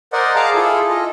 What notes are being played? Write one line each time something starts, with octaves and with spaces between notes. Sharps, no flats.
A#4 C5 D5 D#5 F#5
G#4 F5 A5 A#5 D6
E4 F4 G#4 A4
F4 A4 D#5